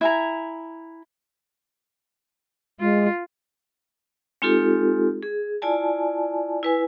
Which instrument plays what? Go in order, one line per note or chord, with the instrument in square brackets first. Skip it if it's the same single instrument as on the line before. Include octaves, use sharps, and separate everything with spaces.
[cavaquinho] E4 G#5 A#5
[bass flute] G#3 [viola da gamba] F4
[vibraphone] G#3 C4 D#4 F4 G4 A4
G#4
E4 F4 D5 G#5 A5
E4 B4 G#5